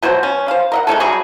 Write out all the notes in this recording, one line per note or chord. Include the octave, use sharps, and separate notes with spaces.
B2 F#3 F#4 C5
C#4
C5 F5
A#4 D#5 F#5
G#3 A3 C#4 A4
F#3 G3 G#4 C#6